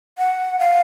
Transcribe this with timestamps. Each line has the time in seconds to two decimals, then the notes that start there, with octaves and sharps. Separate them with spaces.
0.18 F#5
0.59 F5